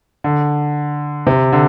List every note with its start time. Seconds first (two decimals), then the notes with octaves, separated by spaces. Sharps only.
0.24 D3
1.27 C3
1.52 D3